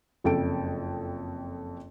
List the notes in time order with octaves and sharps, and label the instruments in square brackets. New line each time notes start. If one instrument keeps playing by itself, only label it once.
[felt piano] F#1 F2 A4 G5 D7